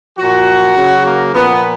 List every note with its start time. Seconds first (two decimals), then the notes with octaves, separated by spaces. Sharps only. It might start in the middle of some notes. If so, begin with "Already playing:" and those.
0.17 A#2 F3 F#4
0.75 C#3 F#3
1.04 A#3
1.33 A#2 F3 B3